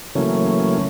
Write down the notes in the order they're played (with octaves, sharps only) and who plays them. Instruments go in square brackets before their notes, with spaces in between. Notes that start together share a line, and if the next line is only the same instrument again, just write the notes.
[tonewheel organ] C#3 E3 F#3 A3 A#3 C#4